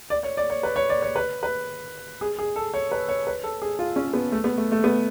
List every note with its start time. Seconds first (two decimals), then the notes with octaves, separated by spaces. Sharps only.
0.10 D5
0.23 C#5
0.37 D5
0.50 C#5
0.63 B4
0.76 C#5
0.90 D5
1.02 C#5
1.16 B4
1.43 B4
2.21 G#4
2.39 G#4
2.56 A4
2.74 C#5
2.91 B4
3.09 C#5
3.27 B4
3.44 A4
3.62 G#4
3.79 F4
3.96 C#4
4.13 B3
4.32 A3
4.44 B3
4.58 A3
4.72 A3
4.84 B3